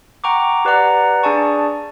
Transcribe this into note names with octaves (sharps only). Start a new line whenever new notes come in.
F#5 G5 A#5 C#6 D6
G4 B4 D5 F#5 A#5
D4 G#4 D5 G#5 A5 C#6